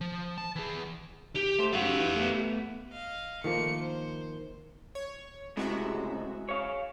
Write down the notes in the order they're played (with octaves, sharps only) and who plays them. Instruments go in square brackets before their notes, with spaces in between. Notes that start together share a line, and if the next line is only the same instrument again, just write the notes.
[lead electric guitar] F3
A5
E3 G#4
[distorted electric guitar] G4
[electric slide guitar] A3 C5
[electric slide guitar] F#2 C#3 F#4 [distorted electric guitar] G4 F5
[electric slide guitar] E3
A3 B3
[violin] D#5 F5
[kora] D#3 F3 A#3 [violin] A3 C#7
[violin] C5
[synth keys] C#5
[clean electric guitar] C#2 A2 C3 [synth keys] G#3 F#4 E5
[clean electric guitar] C#5 F5